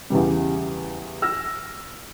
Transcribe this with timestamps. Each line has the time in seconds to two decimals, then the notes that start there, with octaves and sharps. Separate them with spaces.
0.10 E2 C#3 E3 G3
1.22 E6 F6 A#6